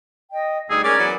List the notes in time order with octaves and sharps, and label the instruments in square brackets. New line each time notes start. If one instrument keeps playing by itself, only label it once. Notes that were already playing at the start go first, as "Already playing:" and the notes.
[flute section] D#5 G5
[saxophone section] D2 G3 D#4 [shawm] G#4 [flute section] E6
[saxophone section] G#3 C#4 [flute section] A#4 G#6 [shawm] D5
[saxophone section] E3 F#3 B3